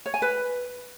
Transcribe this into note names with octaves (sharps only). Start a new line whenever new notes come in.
C#5
G#5
B4